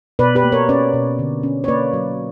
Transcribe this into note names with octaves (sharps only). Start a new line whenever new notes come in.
B2 B4 D5
G4 B4
A#3
A#4 C#5
C#4 B4 D5
B2
D3
C#4
C#5
A#3 B4 D5
F#3